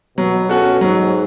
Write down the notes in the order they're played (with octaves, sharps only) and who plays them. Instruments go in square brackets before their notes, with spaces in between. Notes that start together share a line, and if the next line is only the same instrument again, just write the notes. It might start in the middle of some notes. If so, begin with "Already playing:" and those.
[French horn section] B2 [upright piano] F#3
[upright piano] C#4 F#4 A4
[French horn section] G#2 [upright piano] F#3